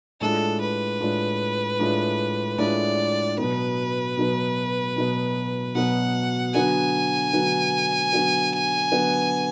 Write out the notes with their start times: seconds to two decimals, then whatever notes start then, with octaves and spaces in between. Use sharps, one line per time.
0.21 A2 G#3 D4 F4 A4
0.61 B4
1.00 A2 G#3 D4 F4
1.79 A2 G#3 D4 F4
2.58 A2 G#3 D4 F4 D5
3.37 B2 F#3 B3 B4
4.17 B2 F#3 B3
4.96 B2 F#3 B3
5.75 B2 F#3 B3 F#5
6.54 D3 F#3 B3 F#4 B4 G#5
7.33 D3 F#3 B3 F#4 B4
8.13 D3 F#3 B3 F#4 B4
8.92 D3 F#3 B3 F#4 B4